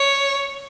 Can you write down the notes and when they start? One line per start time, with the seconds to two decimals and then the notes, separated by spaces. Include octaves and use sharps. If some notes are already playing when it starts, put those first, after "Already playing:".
Already playing: C#5